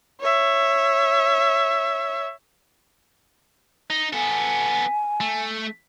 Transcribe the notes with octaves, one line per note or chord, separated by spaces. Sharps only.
C#5 E5
D#4
B3 A4 G#5
A3